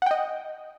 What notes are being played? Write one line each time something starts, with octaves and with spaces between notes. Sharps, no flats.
D#5 F#5 G5